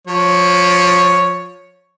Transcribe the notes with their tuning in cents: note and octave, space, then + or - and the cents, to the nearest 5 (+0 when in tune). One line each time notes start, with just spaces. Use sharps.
F3 +25 C#5 +0